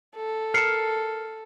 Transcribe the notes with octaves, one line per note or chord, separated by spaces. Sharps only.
A4
A#4 A5 F6 C7 C#7